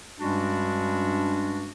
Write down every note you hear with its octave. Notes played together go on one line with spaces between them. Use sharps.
G2 G3 G#3 C#4 D4 F#4